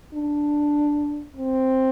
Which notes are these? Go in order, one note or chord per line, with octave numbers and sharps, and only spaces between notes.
D4
C4